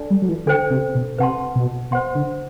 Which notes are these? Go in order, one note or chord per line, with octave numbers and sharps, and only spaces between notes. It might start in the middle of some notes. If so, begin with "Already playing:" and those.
Already playing: D4 A4 D5 A5
G3
F#3
E3
D3 D4 A4 C5 G5
C3
B2
C3 B4 F#5 A5 C6
B2
B2 C5 F#5 C6
D3